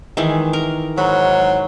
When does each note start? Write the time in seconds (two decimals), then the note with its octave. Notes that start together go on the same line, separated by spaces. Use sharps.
0.17 D#3 E3 G#3
0.53 A#4
0.97 G#2 F#3 B5